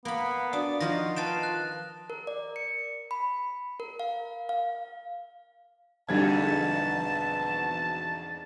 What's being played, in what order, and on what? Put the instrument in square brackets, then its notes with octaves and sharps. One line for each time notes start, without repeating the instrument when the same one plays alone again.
[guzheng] A#3 B5 [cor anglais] B3 [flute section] F5
[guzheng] D4 [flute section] F#4 D5 [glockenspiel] D#6
[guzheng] D#3 F3 F#4 [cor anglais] F4 [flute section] D#5 [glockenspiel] A#6
[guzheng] B4 F5 G5 [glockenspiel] A5 A6 E7
[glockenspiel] A5 F#6
[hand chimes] A#4
D5
C#7
B5
A#4
F5
F5
[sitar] E2 G#2 D#4 [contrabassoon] B2 [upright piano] D3 G3 G#6 [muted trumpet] A5